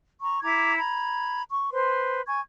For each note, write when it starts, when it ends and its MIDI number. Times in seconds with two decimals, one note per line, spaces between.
0.22 0.41 82
0.22 0.41 85
0.43 0.77 64
0.43 0.77 82
0.43 0.77 86
0.43 0.77 92
0.78 1.42 82
0.78 1.42 83
0.78 1.42 92
1.50 1.71 85
1.73 2.21 71
1.73 2.21 72
1.73 2.21 84
2.26 2.40 80
2.26 2.40 85
2.26 2.40 92